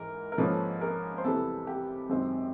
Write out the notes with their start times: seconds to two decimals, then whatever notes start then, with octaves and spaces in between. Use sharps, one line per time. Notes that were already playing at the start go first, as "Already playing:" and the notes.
Already playing: G#2 E3 A#4
0.32 A#4
0.38 G#2 F3 A#3 C#4 A4 B4
0.81 G#4 A#4
1.18 C5
1.24 E2 C3 E3 G3 A4 B4
1.67 G4
2.09 F#2 D#3 G#3 C4